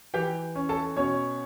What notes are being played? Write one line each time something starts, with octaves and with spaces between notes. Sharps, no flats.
E3 G4 G5
C#4
A4 A5
B2 C#4 C#5